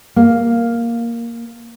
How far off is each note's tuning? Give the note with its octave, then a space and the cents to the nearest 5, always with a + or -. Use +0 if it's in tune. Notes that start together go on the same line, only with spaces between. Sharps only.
A#3 +0